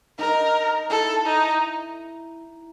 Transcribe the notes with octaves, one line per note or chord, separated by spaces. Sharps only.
D#4 A#4
E4 A4
D#4